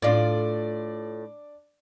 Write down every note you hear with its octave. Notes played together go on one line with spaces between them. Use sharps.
A2 D4 F4 D5